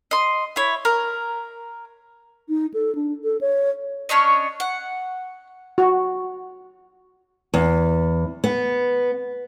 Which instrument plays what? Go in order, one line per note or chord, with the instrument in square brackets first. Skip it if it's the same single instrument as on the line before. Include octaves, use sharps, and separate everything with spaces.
[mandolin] D#5 C6
E4 C#5
A#4
[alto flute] D#4
A4
D4
A4
C#5
[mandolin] C#4 D4 C#5 D#5
F#5
[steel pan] F#4
[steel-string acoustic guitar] E2
B3